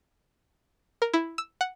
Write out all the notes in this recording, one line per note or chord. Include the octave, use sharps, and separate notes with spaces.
A#4
E4
E6
F#5